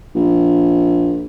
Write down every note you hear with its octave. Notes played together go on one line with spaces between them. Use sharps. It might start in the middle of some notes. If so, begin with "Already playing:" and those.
A#1